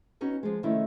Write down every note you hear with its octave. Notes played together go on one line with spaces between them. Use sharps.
B3 C#4 D#4 F#4
F3 G#3
C3 D#3 F3 A3 C#4 E4